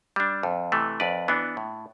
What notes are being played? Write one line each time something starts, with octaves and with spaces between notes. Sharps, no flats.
G3 D4
F2
C3 E3 A3
F2 B4 D5
E3 B3 D4
A2